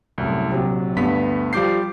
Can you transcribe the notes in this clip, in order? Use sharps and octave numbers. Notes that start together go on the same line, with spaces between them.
C2 F#2 A2
A#1 C3 F#3
D2 G2 B3 B6
F3 G3 F4 D6 G6 C7